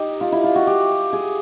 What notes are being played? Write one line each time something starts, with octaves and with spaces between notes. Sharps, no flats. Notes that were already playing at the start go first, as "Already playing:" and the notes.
Already playing: D#4 G4
F4
E4
F4
F#4
G4
G#4